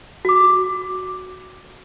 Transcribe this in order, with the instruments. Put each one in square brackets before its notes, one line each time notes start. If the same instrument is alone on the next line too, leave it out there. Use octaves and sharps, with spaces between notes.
[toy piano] F#4 D6